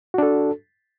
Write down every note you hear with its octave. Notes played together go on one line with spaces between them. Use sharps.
D4 F#4 A4